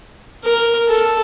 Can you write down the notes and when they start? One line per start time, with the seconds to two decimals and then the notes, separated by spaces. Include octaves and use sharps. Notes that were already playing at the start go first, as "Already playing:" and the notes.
0.44 A#4
0.88 A4